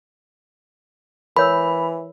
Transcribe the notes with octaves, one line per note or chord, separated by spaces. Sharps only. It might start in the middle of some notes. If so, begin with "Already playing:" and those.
E3 A#4 C#5 B5 E6